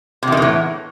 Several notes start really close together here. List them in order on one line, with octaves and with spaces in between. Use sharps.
C3 E2 D#3 E3 A2